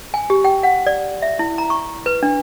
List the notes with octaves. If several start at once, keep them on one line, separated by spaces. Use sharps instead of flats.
G#5
G4
G5
F#5
D5
E5
E4
A#5
C#6
B4
D4